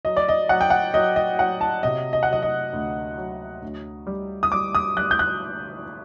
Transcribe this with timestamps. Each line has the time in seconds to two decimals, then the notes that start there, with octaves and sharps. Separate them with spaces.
0.05 F#3 D#5
0.17 D5
0.29 D#5
0.49 F#3 F#5
0.61 G5
0.70 F#5
0.94 F#3 D#5
1.16 D#5
1.39 F#3 F#5
1.61 A5
1.83 C3 D#5
2.13 D#5
2.23 F#5
2.28 F#3 D#5
2.43 D#5
2.73 D2
3.18 F#3
3.62 D2
4.07 G3
4.43 D#6
4.52 G3 D6
4.75 D#6
4.97 G3 F#6
5.11 G6
5.19 F#6